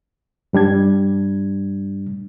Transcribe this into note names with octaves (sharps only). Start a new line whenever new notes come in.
G2 G3 D4 G#6